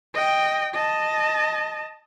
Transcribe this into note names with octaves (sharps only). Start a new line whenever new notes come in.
D#5 G5
D#5 A5